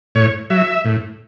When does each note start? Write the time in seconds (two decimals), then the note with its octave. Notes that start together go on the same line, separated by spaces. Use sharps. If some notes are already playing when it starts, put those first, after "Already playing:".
0.15 A2 C#5
0.50 F#3 E5
0.85 A2